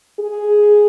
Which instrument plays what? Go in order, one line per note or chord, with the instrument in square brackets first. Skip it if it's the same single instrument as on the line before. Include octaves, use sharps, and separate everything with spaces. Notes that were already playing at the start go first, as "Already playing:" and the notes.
[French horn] G#4